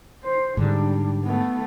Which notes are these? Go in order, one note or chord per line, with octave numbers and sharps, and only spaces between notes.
C5
G#2 D3 G3 D4
A3 B3